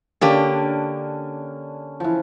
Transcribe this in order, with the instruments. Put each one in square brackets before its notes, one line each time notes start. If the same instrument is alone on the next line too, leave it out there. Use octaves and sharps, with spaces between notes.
[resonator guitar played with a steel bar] D3 A#3 G4 [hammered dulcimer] C#4 D4
[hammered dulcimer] E3 F3